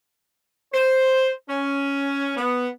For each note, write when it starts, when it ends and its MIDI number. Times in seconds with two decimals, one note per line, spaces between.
0.73 1.29 72
1.49 2.34 61
2.37 2.67 59